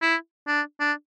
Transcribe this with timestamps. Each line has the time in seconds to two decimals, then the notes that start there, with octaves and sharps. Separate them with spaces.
0.02 E4
0.48 D4
0.80 D4